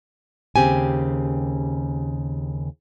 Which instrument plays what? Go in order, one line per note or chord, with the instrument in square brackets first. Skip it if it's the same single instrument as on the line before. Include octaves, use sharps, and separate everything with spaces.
[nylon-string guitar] D#2 C#3 C4 G4 G#5